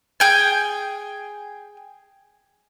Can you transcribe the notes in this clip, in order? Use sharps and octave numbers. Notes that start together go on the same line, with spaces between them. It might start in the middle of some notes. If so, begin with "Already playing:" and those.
G#4 G5 G#5